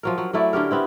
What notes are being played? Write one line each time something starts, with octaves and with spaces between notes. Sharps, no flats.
F3 F#3 A#4
F#3
F#3 A3 E4 D5
D3 C#4 G4 A#4
B3 C4 E4